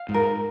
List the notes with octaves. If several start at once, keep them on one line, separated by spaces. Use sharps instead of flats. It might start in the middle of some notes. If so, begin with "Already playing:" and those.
Already playing: F5
G#2
A#4